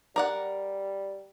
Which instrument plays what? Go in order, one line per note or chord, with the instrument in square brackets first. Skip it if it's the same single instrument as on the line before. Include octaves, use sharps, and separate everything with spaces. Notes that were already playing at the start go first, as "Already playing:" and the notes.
[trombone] G3 [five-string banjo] A#4 D5 F#5